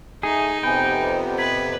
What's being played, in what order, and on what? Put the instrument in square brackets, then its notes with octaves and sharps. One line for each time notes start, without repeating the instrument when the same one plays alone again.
[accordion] A3 [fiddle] D#4 [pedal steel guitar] G#4
[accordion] F2 C3 B3 [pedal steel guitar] G5 [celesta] G#5 B5
[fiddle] B4 [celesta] G#6 B6